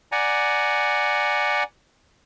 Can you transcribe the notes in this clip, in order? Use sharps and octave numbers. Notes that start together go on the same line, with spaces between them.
D5 F#5 G#5 A#5